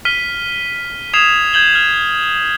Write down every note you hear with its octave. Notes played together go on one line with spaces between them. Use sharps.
F6 B6 D#7 G7
D#6 G#6 C7 E7 F7
G6 G#6 F#7 G7
F6